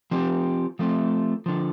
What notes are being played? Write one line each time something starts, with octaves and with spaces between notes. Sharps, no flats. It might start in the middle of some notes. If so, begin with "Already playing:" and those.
F3 C4 G4
F3 A3 C4
D3 F3